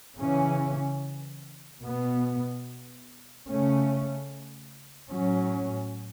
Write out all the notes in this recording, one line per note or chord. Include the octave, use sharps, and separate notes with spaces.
C#3 E3 C#4
B2 B3
C#3 A3 C#4
A2 F#3 C#4